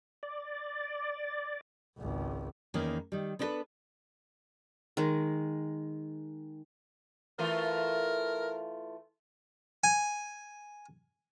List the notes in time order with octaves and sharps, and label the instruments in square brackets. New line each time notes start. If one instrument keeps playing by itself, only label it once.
[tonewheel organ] D5
[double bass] G#1 C#2
[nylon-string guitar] E2 D#3 A#3 C#4
D#3 G3
B3 D4 E4 F#4 A4 B4
[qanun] D#3 G#3
[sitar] E3 A3 F4 [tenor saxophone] A#4
[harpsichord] G#5